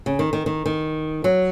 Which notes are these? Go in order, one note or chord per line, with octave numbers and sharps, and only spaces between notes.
C#3
D#3
D#3
D#3
D#3
F#3